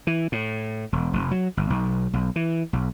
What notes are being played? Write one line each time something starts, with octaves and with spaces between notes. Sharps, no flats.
E3
A2
E1
F1
F#3
G1
B1
B1
E3
B1